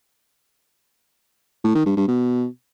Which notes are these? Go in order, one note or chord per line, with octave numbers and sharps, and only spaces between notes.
A2
D#3
G2
G2
B2